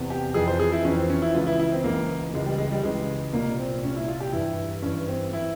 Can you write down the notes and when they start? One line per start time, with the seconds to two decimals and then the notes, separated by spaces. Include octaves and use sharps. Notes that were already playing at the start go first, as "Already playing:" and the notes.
Already playing: E2 C3 E3
0.10 G4
0.34 F2 E3 G#4
0.48 C5
0.60 G#4
0.72 E4
0.85 F2 E3 C#4
0.97 C4
1.10 C#4
1.22 E4
1.35 C#2 C#3 E3 F4
1.47 E4
1.60 E4
1.72 C4
1.84 C#2 C#3 E3 A#3
2.34 C#2 C#3 E3 G#3
2.46 G3
2.58 G#3
2.72 G3
2.83 C#2 C#3 E3 G#3
3.33 C2 A#2 A#3
3.59 C4
3.83 C2 A#2 C#4
3.96 E4
4.08 F4
4.20 G4
4.32 G2 E3 E4
4.82 G2 E3 C#4
5.08 C4
5.33 E3 E4